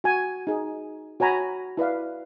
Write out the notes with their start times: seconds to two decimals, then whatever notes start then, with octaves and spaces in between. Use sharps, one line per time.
0.04 F#4 G#5
0.47 D#4 G#4
1.20 F#4 C#5 G#5 A#5 B5
1.77 E4 B4 D5 F5